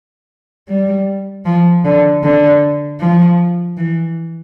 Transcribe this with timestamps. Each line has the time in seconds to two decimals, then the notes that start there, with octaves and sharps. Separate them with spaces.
0.68 G3
1.45 F3
1.85 D3
2.23 D3
3.00 F3
3.77 E3